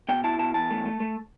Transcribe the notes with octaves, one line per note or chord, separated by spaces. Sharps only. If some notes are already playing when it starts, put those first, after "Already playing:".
B2 G5
E4 A5
B2 A5
E2 A5
A3
A3
A3